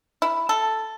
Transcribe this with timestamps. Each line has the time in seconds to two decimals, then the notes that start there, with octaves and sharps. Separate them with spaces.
0.22 E4
0.49 A4